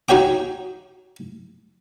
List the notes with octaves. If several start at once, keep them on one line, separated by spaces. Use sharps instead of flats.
D#4 F#4 C#5 G5 D6